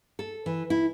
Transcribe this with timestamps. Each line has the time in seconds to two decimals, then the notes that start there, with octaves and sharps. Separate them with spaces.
0.19 A4
0.46 E3
0.70 E4